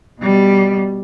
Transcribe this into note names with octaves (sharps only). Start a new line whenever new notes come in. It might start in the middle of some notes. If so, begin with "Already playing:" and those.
B2 G3